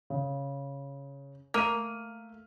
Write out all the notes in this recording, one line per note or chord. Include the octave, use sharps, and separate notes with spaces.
C#3
A3 A#3 F6 D#7